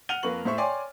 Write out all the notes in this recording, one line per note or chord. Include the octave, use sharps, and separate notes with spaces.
F#5 F6 D#7 F7 G7
F2 A#3 B4 C#6 F#7
A2 C5 E5 C#6
C#5 D5 G5 G#5 C6 D6